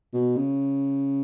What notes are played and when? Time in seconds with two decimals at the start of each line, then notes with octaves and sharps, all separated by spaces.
0.13 B2
0.36 C#3